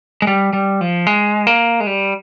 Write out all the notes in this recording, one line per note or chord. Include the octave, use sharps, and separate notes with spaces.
G#3
G3
G3
F3
G#3
A#3
G#3
G3